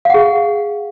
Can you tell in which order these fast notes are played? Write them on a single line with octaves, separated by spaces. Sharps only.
F5 F#5 G#4